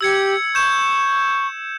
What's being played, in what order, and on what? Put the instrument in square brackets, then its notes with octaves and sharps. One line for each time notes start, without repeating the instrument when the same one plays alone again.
[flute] G4 [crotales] E6 G#6 C#7
[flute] C#6 [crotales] G6 E7